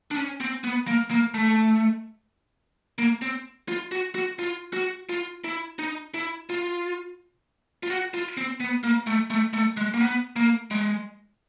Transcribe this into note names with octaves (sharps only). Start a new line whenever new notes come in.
D4
C#4
C4
B3
A#3
A#3
A3
A#3
C4
F4
F#4
F#4
F4
F#4
F4
E4
D#4
E4
F4
F4
F#4
F4
C4
B3
A#3
A3
A3
A3
G#3
A#3
B3
A#3
G#3